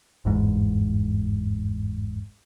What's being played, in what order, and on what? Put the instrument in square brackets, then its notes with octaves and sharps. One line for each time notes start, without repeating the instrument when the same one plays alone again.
[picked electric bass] G1 E2 G#2